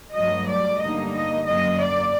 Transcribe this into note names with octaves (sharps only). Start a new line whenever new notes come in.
G2 F#3 A3 D#5
D5
D3 G3 A#3 D#4 D#5
D#5
F#2 F#3 A#3 D#5
D5